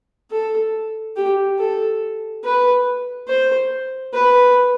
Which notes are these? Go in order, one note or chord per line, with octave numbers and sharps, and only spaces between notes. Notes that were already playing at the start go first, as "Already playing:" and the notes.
A4
G4
A4
B4
C5
B4